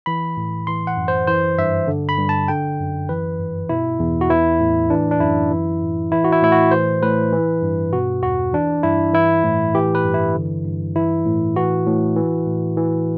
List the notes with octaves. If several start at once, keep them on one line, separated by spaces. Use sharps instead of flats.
E3 B5
A2
E3 C6
F#5
F#2
C5
E3 C5
G2 E5
D3
B5
G2
A5
D3 G5
F#2
E3 B4
G2
B2 E4
E2
F#4
E3 E4
A2
E3 D4
D4
F#2 E4
E3
A2
E3 E4
F#4
E4
A2 E4
F#4
E3 C5
A2 B4
E3
G2
B2 F#4
E2 F#4
E3 D4
G2 E4
E3 E4
A2
E3 G4
B4
G2
E4
D3
G2
E3 E4
A2
E3 F#4
A2
E3
A2
E3